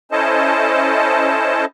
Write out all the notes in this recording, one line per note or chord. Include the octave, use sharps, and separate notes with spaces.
C#4 E4 A4 C5 D#5 A5